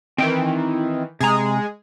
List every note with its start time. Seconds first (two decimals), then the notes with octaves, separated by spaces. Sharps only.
0.18 D#3 E3 C4 G5
1.20 C3 G#3 G#4 A#5